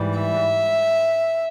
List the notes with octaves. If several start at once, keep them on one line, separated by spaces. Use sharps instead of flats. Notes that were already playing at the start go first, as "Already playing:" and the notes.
Already playing: G#2 E3 G3
E5